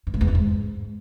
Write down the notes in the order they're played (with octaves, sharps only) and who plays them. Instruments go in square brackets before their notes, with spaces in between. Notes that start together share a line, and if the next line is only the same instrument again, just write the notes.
[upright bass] G2
A2
E2
E3
G#2